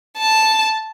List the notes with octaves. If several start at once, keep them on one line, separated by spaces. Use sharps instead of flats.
A5